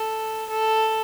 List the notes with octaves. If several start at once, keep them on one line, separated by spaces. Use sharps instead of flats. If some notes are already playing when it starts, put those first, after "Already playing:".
Already playing: A4
A4